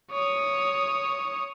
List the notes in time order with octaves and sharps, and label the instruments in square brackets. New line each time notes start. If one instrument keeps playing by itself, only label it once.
[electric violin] C#5 D#6